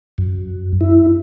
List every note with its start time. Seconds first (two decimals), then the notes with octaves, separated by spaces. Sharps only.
0.18 F#2
0.81 E4